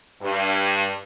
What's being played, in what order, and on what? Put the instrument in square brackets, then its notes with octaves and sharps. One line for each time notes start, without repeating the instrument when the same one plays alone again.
[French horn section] G2